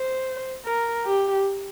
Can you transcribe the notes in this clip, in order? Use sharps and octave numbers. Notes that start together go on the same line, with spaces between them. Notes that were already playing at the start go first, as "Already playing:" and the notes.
Already playing: C5
A#4
G4